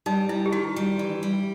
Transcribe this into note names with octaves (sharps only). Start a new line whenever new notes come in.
G3 D#4
G3 E4
G4
D#3 F#4
G3
E3
G3